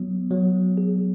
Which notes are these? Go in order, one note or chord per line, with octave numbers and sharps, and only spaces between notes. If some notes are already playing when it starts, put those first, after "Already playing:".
Already playing: F#3 B3
F#3
G#4